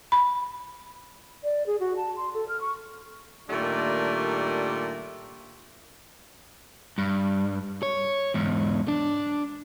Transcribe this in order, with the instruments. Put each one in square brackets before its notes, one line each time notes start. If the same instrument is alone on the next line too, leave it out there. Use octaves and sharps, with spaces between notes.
[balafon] B5
[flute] D5
G#4
F#4
A5
C6
A4
F6
C#6
[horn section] A#2 D#3 G3 A3 D4
[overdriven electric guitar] G2
C#5
E2 G#2
D4